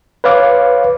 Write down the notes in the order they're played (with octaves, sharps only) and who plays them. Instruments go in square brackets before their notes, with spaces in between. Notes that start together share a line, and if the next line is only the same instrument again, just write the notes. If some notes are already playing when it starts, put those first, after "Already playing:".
[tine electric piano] B4 C#5 F5 D6